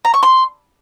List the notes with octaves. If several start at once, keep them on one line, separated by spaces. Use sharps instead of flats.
A#5
C#6
C6